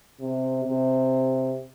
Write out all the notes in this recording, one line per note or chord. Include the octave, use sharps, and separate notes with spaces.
C3
C3